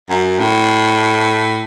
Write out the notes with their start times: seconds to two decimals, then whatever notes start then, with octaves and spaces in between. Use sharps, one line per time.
0.10 F#2
0.39 A2